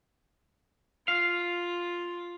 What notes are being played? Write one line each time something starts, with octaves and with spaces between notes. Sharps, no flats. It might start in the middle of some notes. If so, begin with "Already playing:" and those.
F4 F5